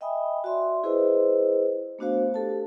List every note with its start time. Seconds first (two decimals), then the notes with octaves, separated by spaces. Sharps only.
0.01 D#5 E5 G5 G#5 B5 D#6
0.44 F#4 D5 E5 C6
0.83 E4 G#4 B4 C5 D#5
1.99 A3 B3 D4 F#4 C5 F5
2.34 G4 A4 A5